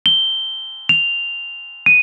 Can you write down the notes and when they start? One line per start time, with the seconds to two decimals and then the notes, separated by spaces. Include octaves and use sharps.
0.06 G7
0.89 F7
1.86 D#7